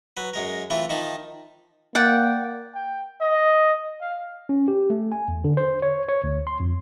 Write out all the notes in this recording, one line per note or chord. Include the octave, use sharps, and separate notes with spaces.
F#3 B4
F#2 G#3 A#4
E3 A3 C4 E4 F4
D#3 F3 D#4 A5 B5
A#3 D5 F#5 G5
G5
D#5
F5
C#4
G4
A3
G#5
E2
D3
C5
C#5
C#5
D2
C6
F2